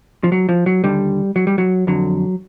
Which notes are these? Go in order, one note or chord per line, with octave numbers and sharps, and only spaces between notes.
F3
F#3
F3
F#3
D#2 D3 G3
F#3
G3
F#3
F2 D3 F#3